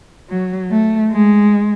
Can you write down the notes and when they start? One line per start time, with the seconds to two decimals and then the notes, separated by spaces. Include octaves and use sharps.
0.29 F#3
0.70 A3
1.12 G#3